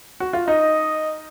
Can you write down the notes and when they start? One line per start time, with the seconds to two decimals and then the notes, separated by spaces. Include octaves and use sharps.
0.20 F#4
0.33 F4
0.47 D#4 D#5